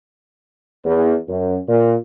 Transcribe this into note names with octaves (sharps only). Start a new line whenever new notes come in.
E2
F#2
A#2